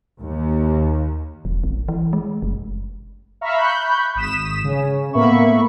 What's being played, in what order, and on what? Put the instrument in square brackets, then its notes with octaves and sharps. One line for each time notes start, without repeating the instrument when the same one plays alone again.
[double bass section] D#2
[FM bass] E1
A1
E3
G#3
F#1
[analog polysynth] E5 F5 A#5 B5 C#6 F6
B5 C#6 F#6 G6
G#1 D#6 B6 E7
C#3 C#4
A2 A#3 B3 E5 B5 C#6